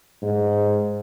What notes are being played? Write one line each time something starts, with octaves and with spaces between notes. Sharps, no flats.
G#2